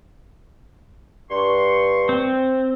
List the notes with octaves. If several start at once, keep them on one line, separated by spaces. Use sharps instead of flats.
G2 C6 C#6
C4